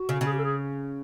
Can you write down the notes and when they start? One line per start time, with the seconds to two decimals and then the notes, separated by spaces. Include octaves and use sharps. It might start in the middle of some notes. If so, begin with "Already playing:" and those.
Already playing: F#4
0.09 C#3
0.21 C#3
0.26 G#4
0.32 G4
0.39 A4
0.44 G#4